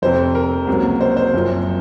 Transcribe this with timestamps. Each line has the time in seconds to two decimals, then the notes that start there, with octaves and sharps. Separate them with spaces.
0.02 F1 F2 C3 C5
0.35 A#4
0.67 C#2 C3 F#3 A#3
1.01 C5
1.17 C5
1.33 F#1 F#2 F3 C4